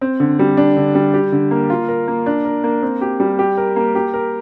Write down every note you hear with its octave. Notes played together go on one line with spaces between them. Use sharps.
C4
D3
G3
D4
D3
G3
G4
D3
A#3
F4
A#4
A#3
D4
A#4
A#3
C4
G4
G3
G4
A#4
A#3
G4
A#4